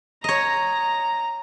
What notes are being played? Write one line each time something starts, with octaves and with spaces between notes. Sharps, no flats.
C#5 D#5 A#5